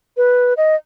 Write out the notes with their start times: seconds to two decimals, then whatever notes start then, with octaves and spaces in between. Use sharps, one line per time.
0.17 B4
0.57 D#5